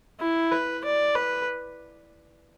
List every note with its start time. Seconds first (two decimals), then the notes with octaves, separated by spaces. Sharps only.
0.20 E4
0.52 B4
0.85 D5
1.16 B4